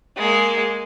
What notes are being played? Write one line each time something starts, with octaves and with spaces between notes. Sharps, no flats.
G#3 A#3